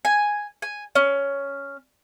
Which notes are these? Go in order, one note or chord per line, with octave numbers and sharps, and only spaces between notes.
G#5
G#5
C#4